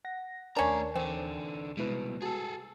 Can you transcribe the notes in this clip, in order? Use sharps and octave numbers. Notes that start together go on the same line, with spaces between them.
F#5 A#6
D#2 A3 C#4 D4 A#4 A#5
D3 E3 C4
C2 B2 G#3 E4 B4
F#4 G#4 A4 A5